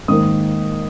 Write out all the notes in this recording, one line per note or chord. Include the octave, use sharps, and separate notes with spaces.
G#2 D#3 A#3 D#6